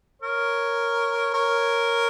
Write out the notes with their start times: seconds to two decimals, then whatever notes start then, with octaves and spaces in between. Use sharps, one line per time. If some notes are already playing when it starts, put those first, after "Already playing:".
0.22 A#4 C#5
1.34 A#4 C#5